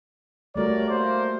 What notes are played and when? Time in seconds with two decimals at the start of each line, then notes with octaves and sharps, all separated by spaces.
0.56 G3 A3 F#4 A#4 C#5 D5
0.89 A#3 C5